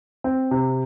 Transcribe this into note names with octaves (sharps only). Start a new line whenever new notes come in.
C4
C3